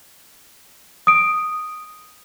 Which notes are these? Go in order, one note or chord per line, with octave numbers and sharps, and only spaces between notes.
D#6 D7